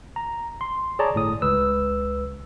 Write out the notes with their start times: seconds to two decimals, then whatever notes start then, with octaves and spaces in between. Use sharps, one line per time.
0.16 A#5
0.61 C6
0.99 G#4 C#5 D5 A5 A#5
1.14 G1 A2 D#6
1.42 C#2 B4 E6